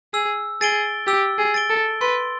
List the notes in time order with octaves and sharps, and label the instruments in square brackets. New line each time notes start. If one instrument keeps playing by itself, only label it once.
[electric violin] G#4 [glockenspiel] E6
[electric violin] G#4 [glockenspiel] A6 D7 G7
[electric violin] G4 [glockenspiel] E6
[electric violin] G#4
[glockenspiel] A6 D7 G7
[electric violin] A4
[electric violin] B4 [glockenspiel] C6